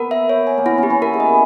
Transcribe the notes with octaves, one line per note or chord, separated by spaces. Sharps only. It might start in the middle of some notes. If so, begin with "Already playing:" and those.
Already playing: B3 A#4
E5
C#5
G#5
A#3
B3 E4
C#4
G4
C#4
E4 A#4
G#4
D#5
B4